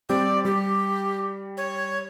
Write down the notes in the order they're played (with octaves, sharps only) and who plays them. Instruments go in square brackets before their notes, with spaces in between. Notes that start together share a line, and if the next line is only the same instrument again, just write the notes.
[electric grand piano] G3 C4 G4 [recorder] D5
[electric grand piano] G3 [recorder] G4
[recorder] C#5